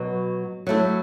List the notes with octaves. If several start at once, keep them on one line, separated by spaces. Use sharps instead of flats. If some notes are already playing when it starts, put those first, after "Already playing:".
Already playing: B2 F#3 F#4 B4
F#3 A3 E4